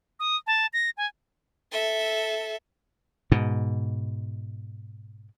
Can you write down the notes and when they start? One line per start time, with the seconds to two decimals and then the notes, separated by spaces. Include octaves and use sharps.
0.20 D#6
0.47 A5
0.73 A#6
0.97 G#5
1.72 A4 E5
3.32 G#2 B2